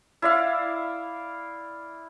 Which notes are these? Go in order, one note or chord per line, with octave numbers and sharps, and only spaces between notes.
E4 D5 F5